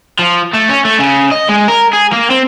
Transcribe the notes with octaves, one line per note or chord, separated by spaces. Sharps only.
F3
A3
C#4
A3
C#3
D#5
G#3
A#4
G#4
A#3
C4